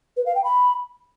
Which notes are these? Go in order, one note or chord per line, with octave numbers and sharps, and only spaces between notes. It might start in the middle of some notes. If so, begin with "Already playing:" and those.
B4
F5
G5
B5